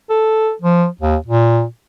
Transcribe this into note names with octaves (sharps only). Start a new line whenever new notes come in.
A4
F3
D#2
A#2